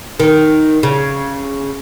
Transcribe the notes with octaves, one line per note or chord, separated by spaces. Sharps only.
D#3
C#3